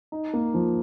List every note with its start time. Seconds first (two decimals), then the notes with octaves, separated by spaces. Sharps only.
0.12 D#4
0.33 A#3
0.54 F3